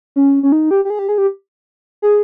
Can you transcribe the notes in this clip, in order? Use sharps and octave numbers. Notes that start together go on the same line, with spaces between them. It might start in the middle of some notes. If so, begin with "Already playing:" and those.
C#4
C#4
D#4
G4
G4
G#4
G4
G#4
G4
G#4